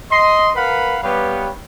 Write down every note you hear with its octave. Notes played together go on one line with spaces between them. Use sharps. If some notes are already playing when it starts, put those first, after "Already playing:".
D#5 C6
A#4 B4 F5 F#5 B5
G3 B3 G4 B4 C#5 F5